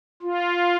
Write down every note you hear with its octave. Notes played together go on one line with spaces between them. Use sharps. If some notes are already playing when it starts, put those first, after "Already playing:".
F4